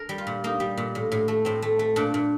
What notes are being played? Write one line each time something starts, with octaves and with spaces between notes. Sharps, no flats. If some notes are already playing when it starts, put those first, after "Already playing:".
Already playing: A#4
G3
F4
A#2
A#3 D#4
G3
A#2
A2
A2
A3
A2 C4
A3
A3
A#2 D4
A#2